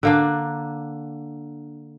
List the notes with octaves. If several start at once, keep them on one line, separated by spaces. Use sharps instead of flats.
D3 A#3 D4